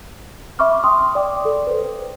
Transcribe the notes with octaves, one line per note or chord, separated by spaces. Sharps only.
E5 B5 C#6 D6 F6
G5 C6 D#6
D5 G5 D6
A4
B4 C5